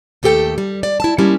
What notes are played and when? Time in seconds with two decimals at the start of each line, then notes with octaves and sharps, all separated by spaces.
0.23 D#2 A3 G4 A4 G5
0.58 G3
0.83 D5
1.00 E4 A5
1.18 G3 G#3 A#3 C#4 E4